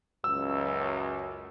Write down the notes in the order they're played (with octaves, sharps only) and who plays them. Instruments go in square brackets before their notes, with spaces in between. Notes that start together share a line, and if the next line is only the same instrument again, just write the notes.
[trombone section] C#2 F#2 [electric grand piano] E6